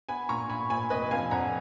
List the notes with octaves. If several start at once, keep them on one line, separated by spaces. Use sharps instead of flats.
B3 G#5 B5
A#2 A#5 C#6
A#2 G#5 B5
A#2 G#5 B5
F1 B4 D#5
F2 F5 G#5
F2 F#5 A#5